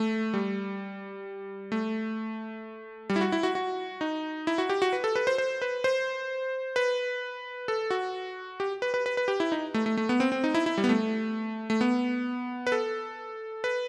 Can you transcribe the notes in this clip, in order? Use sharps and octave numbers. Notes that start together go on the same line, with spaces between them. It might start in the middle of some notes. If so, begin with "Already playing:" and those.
Already playing: A3
G3
A3
G3
E4
F#4
E4
F#4
F#4
D#4
E4
F#4
G4
F#4
B4
A4
B4
C5
C5
B4
C5
B4
A4
F#4
G4
B4
B4
B4
B4
G4
E4
D#4
A3
A3
A3
B3
C4
C4
D#4
E4
E4
G3
B3
A3
A3
B3
B4
A4
B4